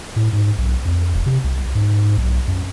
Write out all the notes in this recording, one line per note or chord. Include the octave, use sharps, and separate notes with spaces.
A2
G#2
B1
F2
E1
C3
C2
G#2
B1
F#2